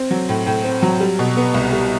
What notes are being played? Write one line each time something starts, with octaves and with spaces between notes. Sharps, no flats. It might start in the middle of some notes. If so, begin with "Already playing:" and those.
Already playing: C4
F#3
A2
A2
C4
F#3
G3
B2
B3
C2
G3